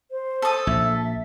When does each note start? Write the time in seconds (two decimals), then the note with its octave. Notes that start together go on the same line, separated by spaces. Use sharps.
0.11 C5
0.42 A4 D#6
0.67 A#1 E5